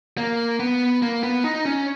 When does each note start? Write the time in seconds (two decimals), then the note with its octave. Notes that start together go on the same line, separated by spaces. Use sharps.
0.18 A#3
0.60 B3
1.02 A#3
1.23 B3
1.44 D#4
1.65 C#4